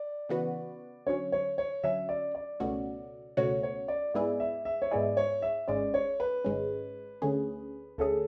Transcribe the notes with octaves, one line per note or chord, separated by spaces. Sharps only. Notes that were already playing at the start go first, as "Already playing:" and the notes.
Already playing: D5
C#3 E3 B3 F#4 B4
D3 F#3 C#4 C#5
C#5
C#5
D3 F#3 C#4 E5
D5
D5
C#2 B2 A3 C#4 F#4
C#2 B2 A3 C#4 F#4 C#5
C#5
D5
G#2 G#3 B3 E4 G#4 D5
E5
E5
C#5
G#2 G#3 B3 E4 G#4 D5
C#5
E5
G#1 G#2 G#3 C#4 D5
C#5
B4
G#1 G#2 G#3 C#4
D2 D3 A3 C#4 G#4
D2 D3 A3 C#4 G#4 A4